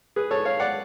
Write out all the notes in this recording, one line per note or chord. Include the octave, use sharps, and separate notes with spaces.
G#4 B4
A4 C#5
C#5 F5
D5 F#5